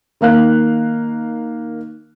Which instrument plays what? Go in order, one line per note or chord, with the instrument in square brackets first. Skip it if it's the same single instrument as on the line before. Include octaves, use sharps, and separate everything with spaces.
[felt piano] D#3 A#3 F5 F#6